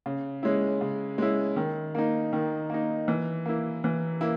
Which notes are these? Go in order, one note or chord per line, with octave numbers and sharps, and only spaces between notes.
C#3
G#3 C#4 E4
C#3
G#3 C#4 E4
D#3
A#3 D#4
D#3
A#3 D#4
E3
A#3 E4
E3
A#3 E4